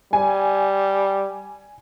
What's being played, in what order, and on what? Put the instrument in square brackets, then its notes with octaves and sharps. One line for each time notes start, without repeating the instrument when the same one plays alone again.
[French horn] G3 [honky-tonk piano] G#5